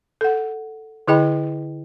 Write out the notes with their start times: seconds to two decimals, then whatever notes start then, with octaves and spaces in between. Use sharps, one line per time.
0.21 A4 F#5
1.07 D3 E4 G#4 D#5 G5 B5